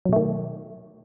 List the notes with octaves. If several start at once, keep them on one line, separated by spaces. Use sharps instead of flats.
B2 D#3 F#3 A3